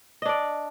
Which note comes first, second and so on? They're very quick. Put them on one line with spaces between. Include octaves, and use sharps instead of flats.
D#5 D4 D5